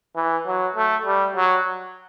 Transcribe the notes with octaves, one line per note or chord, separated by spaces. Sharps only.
E3
F#3
A3
G3
F#3